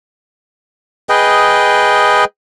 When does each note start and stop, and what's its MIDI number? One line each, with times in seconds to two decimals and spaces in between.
1.09 2.24 68
1.09 2.24 71
1.09 2.24 75
1.09 2.24 79